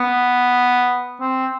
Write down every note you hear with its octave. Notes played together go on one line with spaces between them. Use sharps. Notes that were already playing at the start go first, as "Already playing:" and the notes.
Already playing: B3
C4